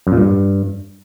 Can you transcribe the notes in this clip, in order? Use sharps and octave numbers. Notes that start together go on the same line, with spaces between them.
F#2
A#2
G2